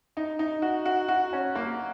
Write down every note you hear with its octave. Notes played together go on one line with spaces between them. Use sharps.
D#4
D#4
F#4
F#4
F#4
C#4
A#3